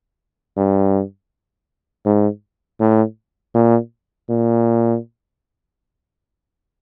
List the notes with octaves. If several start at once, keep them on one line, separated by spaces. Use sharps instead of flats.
G2
G#2
A2
A#2
A#2